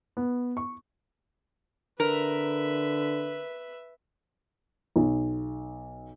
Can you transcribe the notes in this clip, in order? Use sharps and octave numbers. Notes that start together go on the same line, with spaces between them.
B3
C#6
D3 A#4 B4 E5
B1